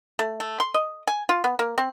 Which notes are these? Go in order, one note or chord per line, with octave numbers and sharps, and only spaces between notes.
A3
A3
C6
D#5
G#5
F4
B3
A#3
C4